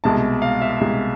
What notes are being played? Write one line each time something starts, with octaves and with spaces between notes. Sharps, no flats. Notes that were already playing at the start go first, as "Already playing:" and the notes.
C2 B2 G#3 A5
F5
E5
C2 B2 G#3